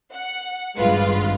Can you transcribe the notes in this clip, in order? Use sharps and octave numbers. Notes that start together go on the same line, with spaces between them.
F#5
G#1 G2 G#3 F4 B4